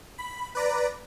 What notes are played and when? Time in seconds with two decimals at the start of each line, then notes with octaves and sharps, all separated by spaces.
0.18 B5
0.55 B4 D5 A#5